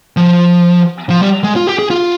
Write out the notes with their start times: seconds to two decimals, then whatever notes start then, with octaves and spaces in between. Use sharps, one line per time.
0.17 F3
1.10 F3
1.21 G3
1.44 G#3
1.56 F4
1.67 G4
1.79 G#4
1.90 F4